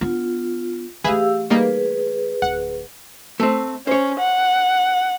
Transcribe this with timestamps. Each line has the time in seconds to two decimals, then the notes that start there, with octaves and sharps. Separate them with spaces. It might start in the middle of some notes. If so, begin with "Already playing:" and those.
0.01 B3 D4 F4
1.04 E3 A3 G4 G#4 B4 E5 F5 E6
1.50 G3 A#3 D#4 G#4 B4
2.42 D1 F#5
3.40 A3 C4
3.87 C#4 C5 C#5
4.19 F#5